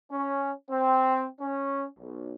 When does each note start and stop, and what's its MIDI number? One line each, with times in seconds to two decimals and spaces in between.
0.11 0.51 61
0.70 1.26 60
1.40 1.85 61
1.99 2.33 35